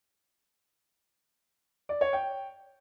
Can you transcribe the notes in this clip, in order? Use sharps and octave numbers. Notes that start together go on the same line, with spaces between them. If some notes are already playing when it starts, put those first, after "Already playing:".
D5
C#5
G5